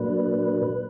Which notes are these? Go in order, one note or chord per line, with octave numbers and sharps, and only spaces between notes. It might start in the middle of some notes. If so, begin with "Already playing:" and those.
Already playing: A#2 F#3 A#3 D4 B4